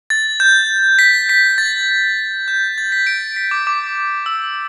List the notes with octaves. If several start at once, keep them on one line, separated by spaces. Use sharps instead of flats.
A6
G6
B6
B6
A6
G6
A6
B6
D7
B6
D6
D6
E6